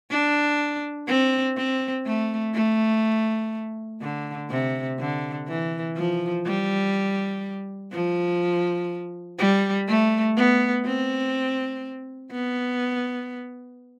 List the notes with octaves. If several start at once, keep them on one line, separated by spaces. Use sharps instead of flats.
D4
C4
C4
A3
A3
D3
C3
D3
E3
F3
G3
F3
G3
A3
B3
C4
B3